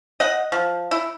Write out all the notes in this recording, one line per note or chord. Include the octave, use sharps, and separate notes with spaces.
D#5 F#5
F3
E4